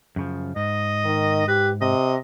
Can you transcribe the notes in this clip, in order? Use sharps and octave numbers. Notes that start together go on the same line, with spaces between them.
F#2 C#3 F3
G#2 D#5
D#3
G4 B4
C3 D#5